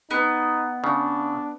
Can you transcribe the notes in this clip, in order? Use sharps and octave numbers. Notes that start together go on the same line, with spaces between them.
B3 D#4
C#3 D4